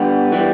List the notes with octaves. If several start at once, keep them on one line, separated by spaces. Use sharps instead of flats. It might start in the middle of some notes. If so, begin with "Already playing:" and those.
Already playing: G2 D3 G3 B3
E3 G3